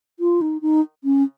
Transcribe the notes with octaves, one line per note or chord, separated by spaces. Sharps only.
F4
D#4
D#4
C#4